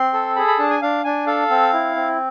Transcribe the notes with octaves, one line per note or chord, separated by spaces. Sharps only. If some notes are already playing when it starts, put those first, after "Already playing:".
Already playing: C4 C6
A4
G#4 B5
B5
D4 A5
G#5
D4 F5
D4 G#5
A4 F5
C4
E4
C4